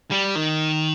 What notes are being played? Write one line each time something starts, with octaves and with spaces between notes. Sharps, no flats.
G3
D#3